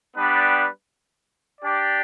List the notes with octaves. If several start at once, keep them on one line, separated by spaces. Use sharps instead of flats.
G3 B3 D4 B4 G5
D4 G4 D5